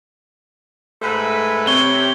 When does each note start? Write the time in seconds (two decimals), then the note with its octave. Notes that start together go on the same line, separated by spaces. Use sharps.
1.02 G#2 A3 B4
1.67 C3 C#5 G7